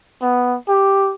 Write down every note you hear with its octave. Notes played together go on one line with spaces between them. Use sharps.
B3
G4